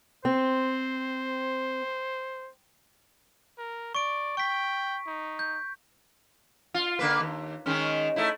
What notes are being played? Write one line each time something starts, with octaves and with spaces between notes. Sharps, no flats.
C4 C5
A#4
D5 C#6 D7
G5 C#6 B6
D#4
G6
F4
D3 A#3 B4
D#2
D#3 G#3 C#4
A3 D#4 E4